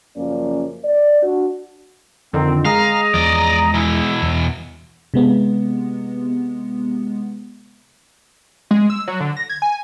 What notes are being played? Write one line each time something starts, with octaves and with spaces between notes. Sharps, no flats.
F#2 C#3 F3 A#3 C#4 D5
D5
D4 F#4
F2 D3 D#3 C4
G#3 F5 A#5 D#6
E2 F3 D5 D#5
B2 E3 E4
E2
C3 G#3 B3
G#3
E6
F#3
D3
A#6
G#6
G#5